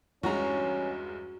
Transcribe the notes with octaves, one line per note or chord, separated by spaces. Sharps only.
E2 G2 G#3 C#4 F#4 A#5